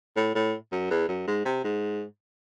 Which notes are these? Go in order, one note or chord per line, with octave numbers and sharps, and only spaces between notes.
A2
A2
F#2
E2
F#2
G#2
C3
G#2